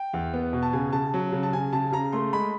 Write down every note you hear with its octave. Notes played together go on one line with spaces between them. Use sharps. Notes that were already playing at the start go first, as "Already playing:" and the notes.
Already playing: G5
E2
B3
B2
A5
C#3 G#5
C#3 A5
F#3
C#3
A5
C#3 G#5
C#3 A5
C#3 A#5
A3 C6
G#3 B5